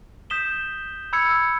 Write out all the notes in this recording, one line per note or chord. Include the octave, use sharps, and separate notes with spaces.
D#6 G6 B6 E7 G7
B5 E6 G#6 C#7